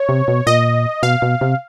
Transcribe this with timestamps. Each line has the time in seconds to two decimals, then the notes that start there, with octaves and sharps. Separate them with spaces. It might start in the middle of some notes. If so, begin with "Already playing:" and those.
Already playing: C#5
0.09 C3
0.28 B2
0.47 A#2 D#5
1.03 B2 F5
1.22 B2
1.41 C3